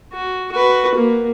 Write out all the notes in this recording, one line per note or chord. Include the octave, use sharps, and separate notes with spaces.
F#4
F#4 B4
A#3